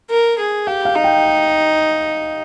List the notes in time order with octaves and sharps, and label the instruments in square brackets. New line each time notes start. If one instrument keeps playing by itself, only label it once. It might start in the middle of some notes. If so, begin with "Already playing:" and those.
[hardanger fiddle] A#4
G#4
[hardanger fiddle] G4 [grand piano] F5
[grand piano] F5
[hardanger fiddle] D#4
[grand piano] G5